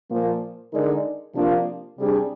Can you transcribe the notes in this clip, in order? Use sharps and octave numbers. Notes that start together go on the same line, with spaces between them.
A#2 F3 A#3
D3 G#3 D#4 A#4 D5
C3 F3 A#3 D4 F4
C3 G3 D4 G#4